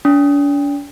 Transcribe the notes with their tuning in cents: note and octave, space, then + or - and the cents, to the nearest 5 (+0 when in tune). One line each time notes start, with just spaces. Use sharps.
D4 -45